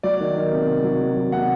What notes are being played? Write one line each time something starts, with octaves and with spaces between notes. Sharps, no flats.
F#3 D5
D#3
D#3
C3
C3
F#3
D#3
F#3
C3 F#5